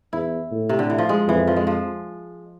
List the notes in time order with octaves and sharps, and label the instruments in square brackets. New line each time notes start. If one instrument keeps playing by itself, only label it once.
[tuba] E2 [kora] E4
[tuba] A2
[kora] C3
D3
E3
F3
G#3
[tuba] F2 [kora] E3
[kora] F3
G#3
F3